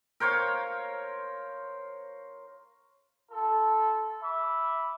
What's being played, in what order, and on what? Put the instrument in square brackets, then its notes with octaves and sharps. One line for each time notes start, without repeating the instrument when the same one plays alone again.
[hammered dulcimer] A#4 C5 C#5 F5
[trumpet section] F4 A4
E5 B5 D6